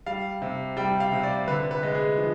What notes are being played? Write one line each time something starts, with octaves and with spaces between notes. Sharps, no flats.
G3 F5
C3
G3 G5
F5
C3
D5
D3 B4
B4
G#3
G#4
F3